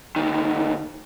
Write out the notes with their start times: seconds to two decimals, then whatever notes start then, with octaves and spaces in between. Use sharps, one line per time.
0.16 D2 D#3